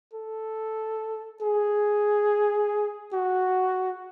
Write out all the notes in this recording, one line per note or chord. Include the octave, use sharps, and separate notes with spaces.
A4
G#4
F#4